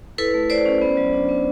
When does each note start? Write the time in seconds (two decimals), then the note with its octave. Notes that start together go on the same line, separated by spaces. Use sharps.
0.18 E4 A4 B4
0.34 A3
0.50 E4 C5 D5
0.66 C#4
0.82 B3
0.97 F#3
1.13 D4
1.29 B3